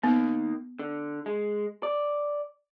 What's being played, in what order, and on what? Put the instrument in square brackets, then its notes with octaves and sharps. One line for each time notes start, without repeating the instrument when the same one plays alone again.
[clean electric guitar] D#3 A#3 [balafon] B3
[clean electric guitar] D3
G#3
D5